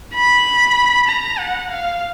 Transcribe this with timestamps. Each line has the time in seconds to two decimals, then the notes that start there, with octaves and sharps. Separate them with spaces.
0.15 B5
1.09 A#5
1.39 F#5
1.71 F5